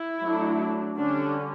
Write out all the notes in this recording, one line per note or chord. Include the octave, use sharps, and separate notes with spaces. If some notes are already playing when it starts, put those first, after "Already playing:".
Already playing: E4
F#3 A3 D4
D3 G3 C#4 D4